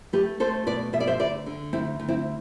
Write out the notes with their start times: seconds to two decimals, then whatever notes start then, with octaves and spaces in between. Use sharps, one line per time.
0.13 A3 G4 B4
0.40 A3 A4 C5
0.67 B2 B4 D5
0.93 B2 E5
1.00 D5
1.07 C5 E5
1.19 D2 B4 D5
1.46 D3
1.73 D2 C4 E4
2.00 D2
2.08 C4 E4